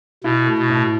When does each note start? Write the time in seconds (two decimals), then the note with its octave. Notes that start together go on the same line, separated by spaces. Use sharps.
0.24 B2 E4
0.47 A3
0.59 B2
0.70 A2